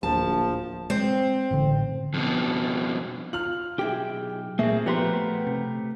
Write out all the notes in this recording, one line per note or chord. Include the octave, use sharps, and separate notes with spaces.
D1 A#1 F3 A5
G#3 C4
A1 D3
F2 B2
F4 F6 F#7
B1 F3 G4 G#4 E5 G5
A#2 A3 A#3 C4 G#4
F3 A3 B3 G4 A#4 B4 C6
C3